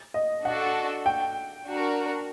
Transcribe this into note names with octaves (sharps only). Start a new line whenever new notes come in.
D#5
D4 F#4 A4 F#5
G5
D4 F#4 A#4